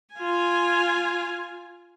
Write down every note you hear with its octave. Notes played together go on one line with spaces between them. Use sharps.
F4 G#5